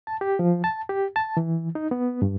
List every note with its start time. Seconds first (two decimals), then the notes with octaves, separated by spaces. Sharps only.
0.07 A5
0.21 G4
0.39 F3
0.64 A5
0.89 G4
1.16 A5
1.37 E3
1.75 D#4
1.91 B3
2.22 G2